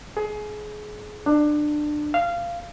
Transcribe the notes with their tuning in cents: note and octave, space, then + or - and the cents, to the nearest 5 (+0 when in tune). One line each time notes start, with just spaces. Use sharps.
G#4 +25
D4 +20
F5 -15